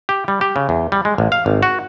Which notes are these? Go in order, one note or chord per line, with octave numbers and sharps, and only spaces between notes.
G4
G3
G4
C#3
E2
G3
G#3
A1
F5
G#1
F#4